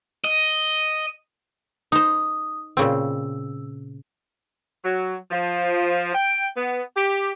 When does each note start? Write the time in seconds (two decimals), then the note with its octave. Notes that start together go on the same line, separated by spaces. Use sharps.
0.24 D#5
1.92 D#4 C5 D#6
2.77 A#2 C#3 C4 E6
4.84 F#3
5.31 F3
6.15 G5
6.56 B3
6.96 G4